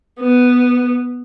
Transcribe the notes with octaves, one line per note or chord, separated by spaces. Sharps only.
B3